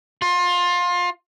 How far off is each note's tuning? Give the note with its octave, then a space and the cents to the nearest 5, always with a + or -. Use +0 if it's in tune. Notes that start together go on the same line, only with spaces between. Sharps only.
F4 +25